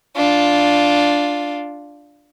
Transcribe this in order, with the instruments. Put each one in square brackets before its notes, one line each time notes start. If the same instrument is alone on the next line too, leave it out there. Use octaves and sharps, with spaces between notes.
[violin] D4 F4